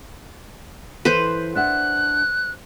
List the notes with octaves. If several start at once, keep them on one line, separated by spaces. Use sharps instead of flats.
E3 A4 B4 C5
D4 E5 F#5 F#6